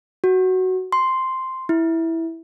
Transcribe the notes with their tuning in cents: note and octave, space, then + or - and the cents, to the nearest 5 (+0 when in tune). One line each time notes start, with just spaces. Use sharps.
F#4 +10
C6 +0
E4 -5